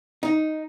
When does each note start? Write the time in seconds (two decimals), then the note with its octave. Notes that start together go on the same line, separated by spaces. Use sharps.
0.23 D#4